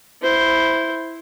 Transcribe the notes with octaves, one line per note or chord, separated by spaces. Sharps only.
E4 C5